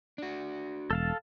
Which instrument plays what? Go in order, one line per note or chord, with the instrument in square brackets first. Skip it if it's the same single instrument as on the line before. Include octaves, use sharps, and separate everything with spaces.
[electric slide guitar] D4 F#4
[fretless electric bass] E1 [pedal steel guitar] A4 F5 A5